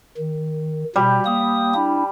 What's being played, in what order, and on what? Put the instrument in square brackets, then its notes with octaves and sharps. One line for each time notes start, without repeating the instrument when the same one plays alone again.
[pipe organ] D#3
[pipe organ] B2 [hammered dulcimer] G3
[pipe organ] A#3 D#6
D4 E4